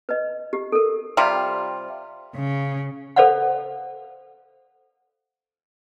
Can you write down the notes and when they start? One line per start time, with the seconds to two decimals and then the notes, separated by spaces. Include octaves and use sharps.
0.09 B4 D#5
0.53 G4
0.72 A4 A#4
1.17 C3 G3 F4
2.35 C#3
3.16 A4 C5 D5 F5 F#5